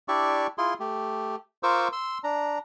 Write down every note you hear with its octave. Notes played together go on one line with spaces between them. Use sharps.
D4 E4 G4 D5 E5 C#6
E4 F4 G#4 C6
A3 G4
F4 A#4 C5 C#6 D6 E6
C6 E6
D4 A#5